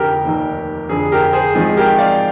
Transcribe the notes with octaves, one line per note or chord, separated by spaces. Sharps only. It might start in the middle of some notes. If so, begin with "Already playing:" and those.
Already playing: F1 F2 D3 F3 G4 A#4
F1 D#2 D#3 A#3
F1 F2 D3 G#4
G4 A#4
G#4 C5
G#1 G#2 F3 G#3 C4 G#4
G4 A#4
D5 F5